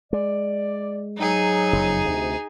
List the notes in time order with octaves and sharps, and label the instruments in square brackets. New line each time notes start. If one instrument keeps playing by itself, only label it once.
[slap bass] G#3 [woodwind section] D5
[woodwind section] G#2 F#3 [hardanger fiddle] D#4 G#4
[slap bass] F#1 F2
D2 C3